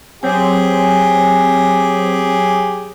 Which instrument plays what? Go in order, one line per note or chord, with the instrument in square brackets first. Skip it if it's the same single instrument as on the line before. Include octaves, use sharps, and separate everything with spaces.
[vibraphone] F#3 C#5 G#5 [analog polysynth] C4 [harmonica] G4 G#4